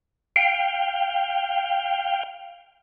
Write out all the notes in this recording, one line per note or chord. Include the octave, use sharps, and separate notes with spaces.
F5 G5